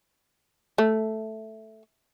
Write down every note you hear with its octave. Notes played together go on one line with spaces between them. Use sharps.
A3